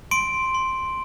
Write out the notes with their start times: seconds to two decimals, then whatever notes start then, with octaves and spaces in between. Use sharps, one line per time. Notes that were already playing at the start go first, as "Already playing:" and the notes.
0.11 C6 D7
0.54 C6